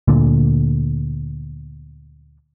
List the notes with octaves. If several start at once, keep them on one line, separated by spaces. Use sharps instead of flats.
D2 A#2 D3